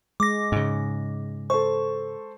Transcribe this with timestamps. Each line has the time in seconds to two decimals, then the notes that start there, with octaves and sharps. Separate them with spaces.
0.20 G#3 D6 A#6
0.52 G#2 C#3
1.50 A4 C5 C#6